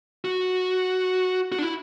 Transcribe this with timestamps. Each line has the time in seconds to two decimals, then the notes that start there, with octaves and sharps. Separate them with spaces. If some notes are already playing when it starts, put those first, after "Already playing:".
0.25 F#4
1.52 F#4
1.59 D4
1.63 E4